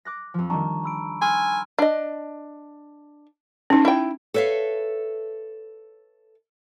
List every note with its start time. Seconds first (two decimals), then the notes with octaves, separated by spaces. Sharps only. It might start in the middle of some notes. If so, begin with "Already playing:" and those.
0.05 D6 F#6 A#6
0.34 F2 F3
0.50 D#3 G3 D4 A5 A#5 C#6
0.84 B5 E6 D7
1.22 G#5 C6 E6 F6
1.79 D4 D#5
3.70 C#4 D#4
3.85 E4 G5
4.34 A4 B4 C#5 E5 F5